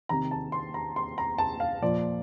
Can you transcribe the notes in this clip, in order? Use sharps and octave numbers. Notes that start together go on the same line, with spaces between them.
C3 D#3 A#5
A5
C6
A#5
C6
A#5
A5
F5
A#2 F3 D5